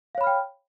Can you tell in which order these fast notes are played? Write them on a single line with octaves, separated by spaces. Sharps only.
F5 C#5 B5 F6 G5